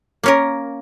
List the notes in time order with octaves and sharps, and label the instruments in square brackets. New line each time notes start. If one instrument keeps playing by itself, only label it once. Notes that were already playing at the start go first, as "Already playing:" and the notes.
[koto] A#3 C#4 A#4